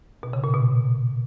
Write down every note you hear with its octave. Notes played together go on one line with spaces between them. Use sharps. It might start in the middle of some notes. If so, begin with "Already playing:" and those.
B2
C#3
A#2
B2